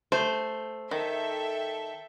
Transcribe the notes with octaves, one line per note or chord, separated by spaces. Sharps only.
A3 C5
D#3 A4 E5 G5